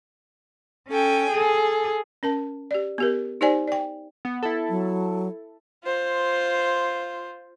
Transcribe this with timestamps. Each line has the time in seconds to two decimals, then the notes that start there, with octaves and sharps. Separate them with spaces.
0.90 C#4 A4 G5 G#5
1.31 G#4 A4
2.23 C#4 A#4 A5
2.71 G4 D5
2.98 B3 G4 A#4
3.41 D#4 G4 C5 D5 G#5
3.68 D5 G5
4.25 B3
4.43 E4 A4
4.69 F#3
5.84 F4 C5